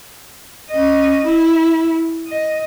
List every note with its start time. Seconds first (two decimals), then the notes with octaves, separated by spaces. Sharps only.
0.70 C#4 D#5
1.24 E4
2.27 D#5